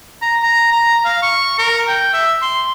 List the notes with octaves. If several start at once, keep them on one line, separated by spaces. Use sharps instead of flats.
A#5
A#5
A#5
F5
C#6
A#4
G5
E5
C6